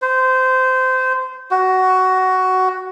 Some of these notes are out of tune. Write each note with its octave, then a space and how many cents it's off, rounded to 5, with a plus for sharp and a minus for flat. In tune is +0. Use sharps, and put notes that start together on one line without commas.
C5 -20
F#4 +10